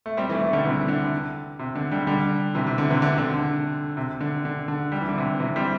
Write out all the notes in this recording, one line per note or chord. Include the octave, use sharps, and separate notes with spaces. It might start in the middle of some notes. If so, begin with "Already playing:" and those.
A3
G3 C4
E3 A3
E3 A3
D3 G3
C3 E3
D3
C3
D3
D3 G3
D3 G3
C3 E3
C3
D3
C3 E3
D3
C3
D3
D3
C3
D3
D3
D3
G3
E3
D3
C3 E3
C3 E3
G3 C4